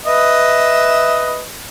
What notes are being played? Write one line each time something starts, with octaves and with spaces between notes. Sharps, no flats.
B4 D#5 E5